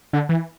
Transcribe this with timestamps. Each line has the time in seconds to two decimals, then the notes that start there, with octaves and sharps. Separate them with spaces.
0.13 D3
0.29 E3